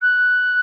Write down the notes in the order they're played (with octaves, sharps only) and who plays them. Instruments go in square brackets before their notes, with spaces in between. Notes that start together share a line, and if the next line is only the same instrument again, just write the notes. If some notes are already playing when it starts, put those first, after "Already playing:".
[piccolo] F#6